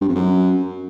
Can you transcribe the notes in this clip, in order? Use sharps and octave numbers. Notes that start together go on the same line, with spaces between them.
G2
F2
F#2